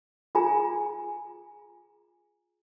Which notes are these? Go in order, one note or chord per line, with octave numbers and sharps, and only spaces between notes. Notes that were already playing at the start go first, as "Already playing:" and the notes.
F4 G#4 G#5 A#5